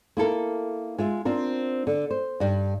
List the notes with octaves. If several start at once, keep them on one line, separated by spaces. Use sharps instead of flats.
A#3 E4 A4 A#4
G#3 F4 E5
C4 D4 F4 A#4
D3
C5
G2 G3